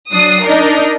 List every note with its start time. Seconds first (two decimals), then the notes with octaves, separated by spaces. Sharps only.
0.12 F#3 D4 D#6 C7
0.45 D4 D#4 A#4